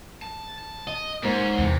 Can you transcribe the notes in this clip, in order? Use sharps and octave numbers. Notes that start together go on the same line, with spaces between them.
A5
D#5
G#2 A#3 C#4 A#4 C5
E2 C3 E3